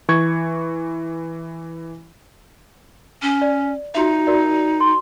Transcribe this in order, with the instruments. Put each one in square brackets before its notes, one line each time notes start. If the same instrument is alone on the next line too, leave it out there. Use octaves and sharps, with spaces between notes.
[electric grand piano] E3 C#6 G#6
[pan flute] C#4
[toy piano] D5
[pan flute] D#4 [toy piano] F4 F#4 E5
[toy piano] F#4 A#4 D5
C6